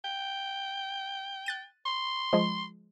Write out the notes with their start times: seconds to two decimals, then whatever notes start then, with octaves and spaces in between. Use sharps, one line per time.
0.05 G5
1.46 F#6 A6 D#7
1.86 C6
2.33 F3 G#3